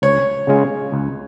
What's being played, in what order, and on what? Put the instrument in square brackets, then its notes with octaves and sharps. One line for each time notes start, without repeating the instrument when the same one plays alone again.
[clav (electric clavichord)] C#2 [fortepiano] C#5
[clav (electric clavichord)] C#3 G#3 C#4 F4
C#2